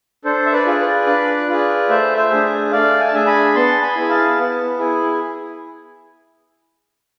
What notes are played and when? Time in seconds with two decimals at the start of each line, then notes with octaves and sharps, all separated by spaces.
0.25 D4 A4 C5
0.46 E5
0.52 B4 D5
0.66 F4 G#4
0.80 B4 D5
1.07 D4
1.48 F4 G#4
1.89 A3 C5 E5
2.17 C5 E5
2.30 D4 G#4
2.72 A3 D5 F5
3.00 G#5
3.08 A5
3.13 D4 G#4 E5 G#5
3.27 G#5 B5
3.55 B3 A5 C6
3.82 G#5 B5
3.96 E4 G#4
4.09 F5 A5
4.38 B3
4.79 E4 G#4